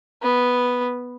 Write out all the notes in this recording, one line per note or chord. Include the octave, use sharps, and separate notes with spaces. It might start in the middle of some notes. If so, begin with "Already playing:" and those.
B3